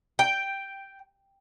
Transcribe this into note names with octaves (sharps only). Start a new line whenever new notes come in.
G5